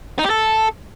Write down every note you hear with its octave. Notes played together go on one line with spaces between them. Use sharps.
D#4
G4
A4